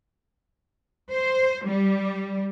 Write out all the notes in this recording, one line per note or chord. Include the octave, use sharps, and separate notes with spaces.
C5
G3